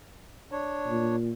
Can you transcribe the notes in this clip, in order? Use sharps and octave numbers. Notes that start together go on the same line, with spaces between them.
D4 C#5
A#2